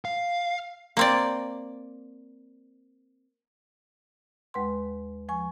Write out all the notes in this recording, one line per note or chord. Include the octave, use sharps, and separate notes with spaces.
F5
A#3 C4 D5
D#2 G#3 B4 F#5 C6
F3 G#5 C#6